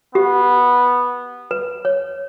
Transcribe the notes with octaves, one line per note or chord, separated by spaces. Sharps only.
B3 G4
B4
C#5